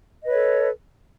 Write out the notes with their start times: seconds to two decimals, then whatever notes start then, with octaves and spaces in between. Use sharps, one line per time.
0.22 D#5
0.25 B4
0.28 C#5
0.32 A4